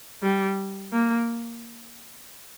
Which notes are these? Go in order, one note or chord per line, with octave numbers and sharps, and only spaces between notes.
G3
A#3